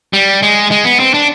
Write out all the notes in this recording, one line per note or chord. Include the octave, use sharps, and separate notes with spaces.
G3
G#3
G#3
B3
C4
D4